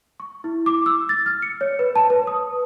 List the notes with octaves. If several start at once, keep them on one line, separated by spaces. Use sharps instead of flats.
C#6
E4
D6
E6
A6
F6
C#7
C#5
B4
A5
B4
D#6